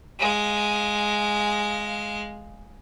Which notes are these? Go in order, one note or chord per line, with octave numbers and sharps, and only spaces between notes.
G#3 F5